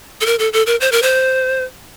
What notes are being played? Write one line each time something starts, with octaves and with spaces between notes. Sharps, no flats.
A4
A#4
A4
A4
A#4
C5
A#4
C5